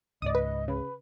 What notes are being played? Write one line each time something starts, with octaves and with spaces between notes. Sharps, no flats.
C#2 G#2 D5 D#5 D#6
B4
C#3 B4